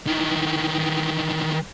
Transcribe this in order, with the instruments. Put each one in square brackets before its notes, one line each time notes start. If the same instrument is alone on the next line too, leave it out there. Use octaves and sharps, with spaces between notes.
[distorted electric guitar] D#3 E3